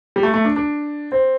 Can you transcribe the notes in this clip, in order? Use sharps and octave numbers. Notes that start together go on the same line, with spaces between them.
G3
A3
A3
D4
D4
C4